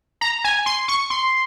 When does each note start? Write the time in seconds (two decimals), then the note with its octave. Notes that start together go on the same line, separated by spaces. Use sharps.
0.21 A#5
0.44 G#5
0.66 C6
0.88 C#6
1.10 C6